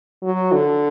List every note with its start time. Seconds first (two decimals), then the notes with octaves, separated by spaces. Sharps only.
0.23 F#3
0.52 D3